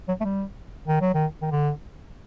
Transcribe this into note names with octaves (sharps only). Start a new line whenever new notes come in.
F#3
A3
G3
D#3
F#3
D#3
D#3
D3